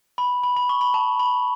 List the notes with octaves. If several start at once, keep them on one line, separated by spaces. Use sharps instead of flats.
B5
B5
B5
C#6
B5
A5
B5